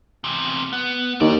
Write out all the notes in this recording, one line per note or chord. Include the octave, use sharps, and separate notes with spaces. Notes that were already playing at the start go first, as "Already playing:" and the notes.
E2 C3
B3
D#2 G3 D5